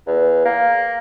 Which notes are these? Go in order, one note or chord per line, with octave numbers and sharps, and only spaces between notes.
E2
A#3